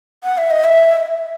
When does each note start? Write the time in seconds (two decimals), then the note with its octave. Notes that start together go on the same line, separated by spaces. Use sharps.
0.24 F#5
0.38 E5
0.51 D#5
0.64 E5